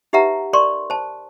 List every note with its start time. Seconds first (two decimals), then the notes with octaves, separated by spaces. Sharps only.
0.13 D#4 G4 B4 E5 F#5 A#5
0.53 A#4 D5 C6 C#6
0.90 C5 A5